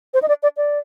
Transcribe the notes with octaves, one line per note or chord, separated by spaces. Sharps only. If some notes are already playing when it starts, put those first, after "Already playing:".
C5
D#5
D5
D5
D5